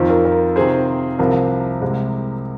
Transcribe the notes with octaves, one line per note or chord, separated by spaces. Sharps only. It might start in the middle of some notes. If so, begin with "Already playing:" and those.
Already playing: F2 D#3 C4 F4
A#4
A#4
C3 D#3 C4 G#4 C5
C2 C3 F3 A#4
C2 C3 G#3